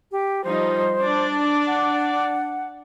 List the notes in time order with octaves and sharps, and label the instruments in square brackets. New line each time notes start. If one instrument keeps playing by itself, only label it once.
[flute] G4
[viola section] F3 G3 D#4 [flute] C5
[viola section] D4 D5
[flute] F#5